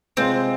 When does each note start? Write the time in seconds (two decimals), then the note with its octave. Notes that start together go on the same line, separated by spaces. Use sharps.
0.17 C3 G#3 C4 F4 C5